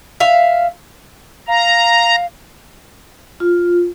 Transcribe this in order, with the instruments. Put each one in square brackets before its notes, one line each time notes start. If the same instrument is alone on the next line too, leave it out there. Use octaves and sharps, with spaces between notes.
[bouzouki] E5 F5
[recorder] F5 [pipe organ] A#5
[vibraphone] F4